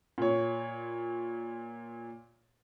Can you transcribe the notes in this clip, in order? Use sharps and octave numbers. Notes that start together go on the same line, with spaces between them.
A#2 C#5